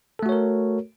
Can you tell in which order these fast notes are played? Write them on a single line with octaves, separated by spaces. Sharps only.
A4 A3 F#4 C#5 A#4